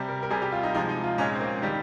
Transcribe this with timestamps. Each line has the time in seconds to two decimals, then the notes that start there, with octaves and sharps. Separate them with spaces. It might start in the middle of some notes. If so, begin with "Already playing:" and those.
Already playing: C3 G3
0.09 A#4
0.23 A#4
0.30 C3 G3 G#4
0.42 G4
0.52 F4
0.63 D#4
0.74 C3 F3 G#3 D#4
0.89 D#4
1.04 F4
1.18 A#2 G#3 C#4
1.35 C4
1.40 A#3
1.62 D#3 G3 G4